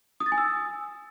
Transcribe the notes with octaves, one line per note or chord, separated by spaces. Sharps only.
D#6
A6
G#5
E6